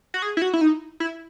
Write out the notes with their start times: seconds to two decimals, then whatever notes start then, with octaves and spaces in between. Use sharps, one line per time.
0.14 F#4
0.22 G#4
0.37 E4
0.42 F#4
0.53 E4
0.61 D#4
1.00 E4